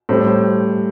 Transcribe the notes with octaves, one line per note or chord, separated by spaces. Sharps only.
A2 G3 C5
C5